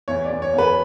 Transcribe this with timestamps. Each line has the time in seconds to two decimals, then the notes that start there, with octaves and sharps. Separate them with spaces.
0.08 E2 C#5
0.25 D5
0.30 E2
0.42 C#5
0.54 E2 B4